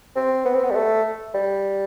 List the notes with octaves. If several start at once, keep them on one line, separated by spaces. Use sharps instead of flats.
C4
B3
C4
B3
G3
A3
G3